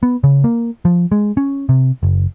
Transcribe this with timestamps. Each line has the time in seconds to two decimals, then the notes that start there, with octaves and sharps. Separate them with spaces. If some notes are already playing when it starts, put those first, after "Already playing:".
0.03 B3
0.24 C#3
0.44 A#3
0.85 F3
1.12 G#3
1.37 C#4
1.69 C3
2.03 F#1